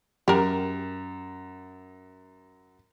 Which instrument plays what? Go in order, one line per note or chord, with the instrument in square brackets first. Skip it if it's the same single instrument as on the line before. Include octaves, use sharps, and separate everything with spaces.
[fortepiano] F#2 [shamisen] G4 A#4